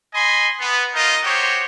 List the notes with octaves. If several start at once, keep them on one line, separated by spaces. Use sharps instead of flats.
D#5 G#5 B5 C6
B3
D#4 F4 A#4 D#5
F#4 G4 C5 C#5